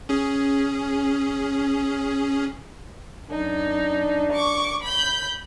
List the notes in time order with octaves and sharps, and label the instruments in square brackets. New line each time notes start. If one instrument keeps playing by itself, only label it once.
[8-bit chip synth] C#4 G#4
[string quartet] F#2 D#4 [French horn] D4
[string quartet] C#6 D6
B5 G6